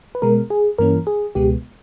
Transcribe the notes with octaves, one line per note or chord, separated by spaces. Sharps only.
B4
B2 G#3 B3 A#4
G#4
G2 E3 A#3 C#4 A#4
G#4
C#2 B2 G#3 B3 G4